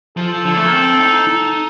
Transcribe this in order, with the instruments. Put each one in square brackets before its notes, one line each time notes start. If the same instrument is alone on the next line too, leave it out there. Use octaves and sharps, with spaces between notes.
[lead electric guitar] F3 [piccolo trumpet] A4
[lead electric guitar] D3
A3
A#3
C4
D#4
D#4